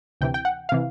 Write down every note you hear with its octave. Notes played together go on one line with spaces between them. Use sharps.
D2 C3 E3 G5
G5
F#5
C3 E3 F5